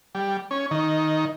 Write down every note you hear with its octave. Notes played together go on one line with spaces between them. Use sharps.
G3
C#4
D#3